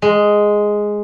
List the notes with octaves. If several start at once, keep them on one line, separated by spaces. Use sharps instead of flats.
G#3